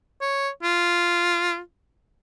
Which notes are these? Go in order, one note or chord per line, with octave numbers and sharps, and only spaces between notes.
C#5
F4